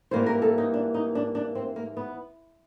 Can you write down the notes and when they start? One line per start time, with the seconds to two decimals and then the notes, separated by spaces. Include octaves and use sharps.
0.11 G#2 E3 G3 A#3 C5
0.26 A#4
0.42 A4
0.58 D#4
0.74 D4
0.94 D#4
1.15 D4
1.35 D4
1.55 C4
1.76 A#3
1.97 B3